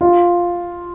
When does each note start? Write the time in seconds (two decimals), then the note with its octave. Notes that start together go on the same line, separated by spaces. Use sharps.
0.01 F4